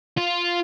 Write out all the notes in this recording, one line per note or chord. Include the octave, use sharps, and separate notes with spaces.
F4